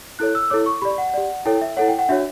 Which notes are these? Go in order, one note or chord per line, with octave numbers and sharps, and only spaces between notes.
E4 A4 C#5 F#6
E6
E4 A4 C#5 D6
C#6
G4 D5 B5
F#5
G4 D5
E4 A4 C#5 G5
E5
E4 A4 C#5 F#5
G5
F#5
D4 F#4 C#5 E5